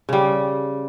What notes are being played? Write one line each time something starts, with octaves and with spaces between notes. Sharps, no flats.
C#3 G3